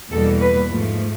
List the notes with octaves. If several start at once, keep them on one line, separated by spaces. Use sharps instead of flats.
E2 B2 G3 A#3 A4
B4
G#2 F3 A3